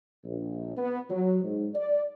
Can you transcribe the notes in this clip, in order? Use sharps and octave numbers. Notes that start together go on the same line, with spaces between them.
A#1
B3
F#3
G#2
D5